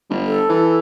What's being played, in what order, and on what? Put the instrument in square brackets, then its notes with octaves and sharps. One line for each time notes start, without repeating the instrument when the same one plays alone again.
[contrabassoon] G1
[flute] A4
[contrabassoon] E3